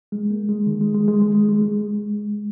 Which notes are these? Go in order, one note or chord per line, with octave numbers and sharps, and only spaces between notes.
G#3
A#3
G#3
D#3
G#3
G#3
G#3
G#3
G#3
G#3
G#3